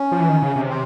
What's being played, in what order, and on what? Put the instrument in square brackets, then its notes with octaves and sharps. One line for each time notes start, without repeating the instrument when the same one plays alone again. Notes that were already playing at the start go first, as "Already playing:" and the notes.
Already playing: [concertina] C#4
[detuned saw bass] F3
E3
D#3
C#3
C3
[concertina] C4